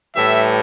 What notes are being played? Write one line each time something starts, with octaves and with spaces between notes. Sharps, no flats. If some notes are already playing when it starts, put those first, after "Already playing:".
A2 E3 G3 E5